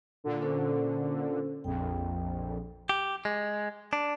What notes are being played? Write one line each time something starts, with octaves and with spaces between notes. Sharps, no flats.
A#2 D3
C#4 A4 C5
A#1 F2 G5
G4
G#3
D4